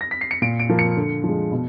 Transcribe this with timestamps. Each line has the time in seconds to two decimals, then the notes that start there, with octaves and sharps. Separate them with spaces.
0.01 A#6
0.11 B6
0.21 C7
0.31 C#7
0.42 A#2 D7
0.59 D7
0.69 F3 A#3
0.79 C#7
0.97 D3
1.24 F3
1.29 G#3
1.52 B2